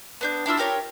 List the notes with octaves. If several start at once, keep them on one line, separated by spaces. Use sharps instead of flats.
B3 D4 G6
D4 E4 F4 E6
F4 G4 A#4 C#5